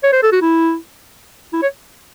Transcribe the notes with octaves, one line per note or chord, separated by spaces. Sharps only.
C#5
C5
A4
F#4
E4
E4
C#5